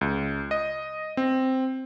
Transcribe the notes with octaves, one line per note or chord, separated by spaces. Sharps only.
C#2
D#5
C4